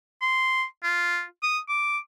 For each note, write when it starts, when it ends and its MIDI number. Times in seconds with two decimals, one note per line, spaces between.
0.21 0.64 84
0.83 1.23 65
1.43 1.59 87
1.69 1.98 86